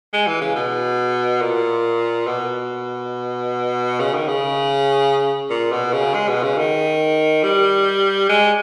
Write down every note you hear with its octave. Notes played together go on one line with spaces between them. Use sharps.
G#3
E3
C#3
B2
A#2
B2
C#3
D#3
C#3
A#2
B2
C#3
G#3
B2
C#3
D#3
G3
G#3